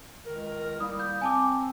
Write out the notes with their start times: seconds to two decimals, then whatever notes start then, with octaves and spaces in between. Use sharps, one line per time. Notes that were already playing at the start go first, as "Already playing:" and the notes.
0.26 C#2 D#3 A#4
0.80 G3 A#3 E4 D#6
1.00 G6
1.21 C4 G#5 A5 D6